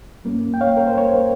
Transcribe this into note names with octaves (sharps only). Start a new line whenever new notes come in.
G2 G3 A#3 C#4
G5
C#5 F5
A#4
C5
A#4 C#5